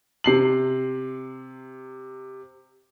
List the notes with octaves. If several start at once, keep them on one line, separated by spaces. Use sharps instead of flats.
C3 C7 F#7